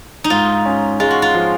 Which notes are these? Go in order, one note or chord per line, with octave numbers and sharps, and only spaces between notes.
D#4
G#2 F4
C#4
G#3 F4
F#4
F4
F3